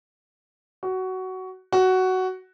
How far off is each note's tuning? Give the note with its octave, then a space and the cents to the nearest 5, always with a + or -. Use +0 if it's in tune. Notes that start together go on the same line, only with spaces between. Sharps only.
F#4 +15
F#4 +10